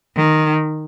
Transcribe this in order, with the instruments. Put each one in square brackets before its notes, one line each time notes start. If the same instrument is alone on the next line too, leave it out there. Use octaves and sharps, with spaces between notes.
[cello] D#3